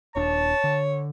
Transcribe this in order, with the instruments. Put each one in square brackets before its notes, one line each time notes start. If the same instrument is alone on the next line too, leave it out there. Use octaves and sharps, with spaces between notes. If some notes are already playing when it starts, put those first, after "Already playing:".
[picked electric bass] D#1 D4 [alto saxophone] C#5 [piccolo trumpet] A5
[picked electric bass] D3